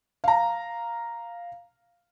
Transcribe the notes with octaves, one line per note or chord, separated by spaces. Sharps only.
F5 A#5